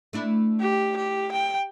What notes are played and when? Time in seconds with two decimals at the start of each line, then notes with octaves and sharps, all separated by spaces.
0.13 A3 D4 E4
0.61 G4
0.97 G4
1.32 G5